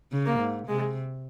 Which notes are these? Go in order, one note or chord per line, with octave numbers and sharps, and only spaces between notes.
C#3
A#3
G#2
C3 G#3